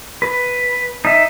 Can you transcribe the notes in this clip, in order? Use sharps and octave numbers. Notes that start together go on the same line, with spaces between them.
B4
D#4 E5